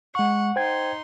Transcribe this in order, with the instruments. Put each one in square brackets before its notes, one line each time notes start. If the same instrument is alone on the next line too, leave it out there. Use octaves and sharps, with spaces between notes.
[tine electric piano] G#3 C#6 [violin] F#5
[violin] D#4 C6 [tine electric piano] C5 G5 G#6